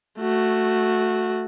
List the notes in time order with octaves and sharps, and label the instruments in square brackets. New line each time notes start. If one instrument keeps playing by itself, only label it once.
[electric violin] A3 F#4